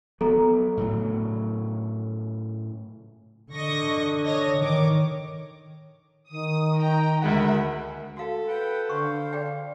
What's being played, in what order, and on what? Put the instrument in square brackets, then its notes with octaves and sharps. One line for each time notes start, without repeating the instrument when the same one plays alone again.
[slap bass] F#3 B3 [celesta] A4 A#5
[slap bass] A2 C#3 F#3
[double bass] D3 [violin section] D#5 C#6 A#6
[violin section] C#5 D#5 A#6
[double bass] D#3 [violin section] C#5 D6
[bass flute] D#3 [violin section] D#6
[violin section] G5 A#5
[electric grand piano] D2 G#3 F#5 [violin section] A#4 E5 B5
[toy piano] F#4 F5 [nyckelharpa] A4
[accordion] B4 F#5 G5
[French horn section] D3 [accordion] C5 F5 [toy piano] C#6
[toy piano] G#4 D5 G5